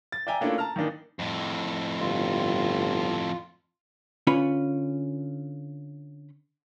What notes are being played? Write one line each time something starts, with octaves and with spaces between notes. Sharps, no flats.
A6
D5 E5 G5 G#5 A#5
A3 A#3 C#4 D4 E4 F4
A5 A#5 F6
D#3 E3 A#3 D4 D#4
F2 A2
G1 F4
D3 C#4 F4 B4 B5